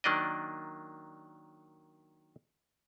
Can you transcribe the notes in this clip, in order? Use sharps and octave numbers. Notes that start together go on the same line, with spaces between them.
D#3 F#3 A#3 D4 D5 D#5